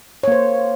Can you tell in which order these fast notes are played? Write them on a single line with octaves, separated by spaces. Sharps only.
C#5 A#3 C5